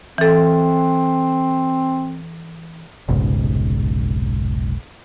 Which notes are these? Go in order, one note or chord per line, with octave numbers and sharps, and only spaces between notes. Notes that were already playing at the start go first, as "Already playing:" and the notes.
E3 C4 A4
F1 B1 G#2 C#3